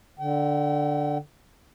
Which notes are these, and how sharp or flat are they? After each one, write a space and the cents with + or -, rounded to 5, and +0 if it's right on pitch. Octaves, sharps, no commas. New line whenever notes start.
D3 +0 G5 -40